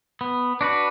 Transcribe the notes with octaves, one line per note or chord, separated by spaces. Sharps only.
B3
D4 F#4 B4